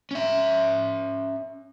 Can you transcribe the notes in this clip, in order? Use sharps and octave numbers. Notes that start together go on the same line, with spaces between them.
C#4 E5